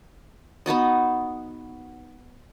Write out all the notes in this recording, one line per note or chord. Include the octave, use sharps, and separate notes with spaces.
B3 D#4 F#4 D#5